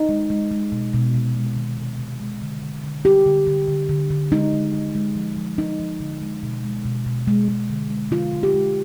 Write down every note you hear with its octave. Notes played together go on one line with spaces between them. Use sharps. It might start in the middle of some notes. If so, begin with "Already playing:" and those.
Already playing: D#4
G#3
G#3
G#3
B2
B2
C3
G#3
D#3
C3
C3
G#3
D3
D3
D3
G3 G4
D3
D3
D3
D3
D3
G#3 D#4
G#3
G#3
G#3
F3
F3
F3 D#4
F3
D3
G#3
B2
G#3
B2
B2
G#3
G#3
D3
G#3
D3 F4
D3
G4
G#3